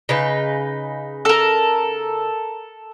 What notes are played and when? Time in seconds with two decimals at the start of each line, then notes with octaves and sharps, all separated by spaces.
0.09 C#3 D#4 B4
1.25 A4 A#4